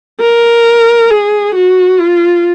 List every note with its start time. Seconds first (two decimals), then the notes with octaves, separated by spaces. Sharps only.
0.20 A#4
1.11 G#4
1.55 F#4
1.99 F4